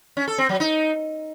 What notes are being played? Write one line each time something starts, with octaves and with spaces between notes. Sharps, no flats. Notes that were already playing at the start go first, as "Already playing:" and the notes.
C#4
A4
C4
F#3
D#4